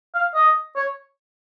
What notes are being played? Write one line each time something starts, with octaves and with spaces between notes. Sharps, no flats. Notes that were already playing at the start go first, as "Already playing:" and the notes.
F5
D#5
C#5